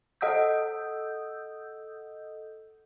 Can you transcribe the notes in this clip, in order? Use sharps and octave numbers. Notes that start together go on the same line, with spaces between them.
A4 D#5 F#5 D#6 E6 G6